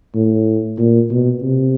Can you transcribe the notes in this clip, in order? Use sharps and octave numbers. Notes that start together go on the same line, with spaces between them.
A2
A#2
B2
C3